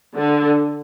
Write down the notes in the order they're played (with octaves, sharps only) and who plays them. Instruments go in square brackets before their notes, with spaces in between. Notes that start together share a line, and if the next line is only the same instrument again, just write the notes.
[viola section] D3